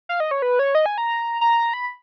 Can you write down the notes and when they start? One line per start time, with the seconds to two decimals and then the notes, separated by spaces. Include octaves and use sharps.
0.09 F5
0.20 D#5
0.31 C#5
0.42 B4
0.59 C#5
0.75 D#5
0.86 G#5
0.98 A#5
1.41 A#5
1.73 B5